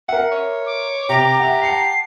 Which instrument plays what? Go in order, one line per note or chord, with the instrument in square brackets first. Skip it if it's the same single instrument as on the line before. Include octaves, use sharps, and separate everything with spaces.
[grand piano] A#4 E5 [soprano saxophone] F#5
[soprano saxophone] C#5
[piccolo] D6
[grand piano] C3 [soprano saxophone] G4 [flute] A#5
[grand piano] E5 F#5
[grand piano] F#5 A5 C#7 [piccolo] C7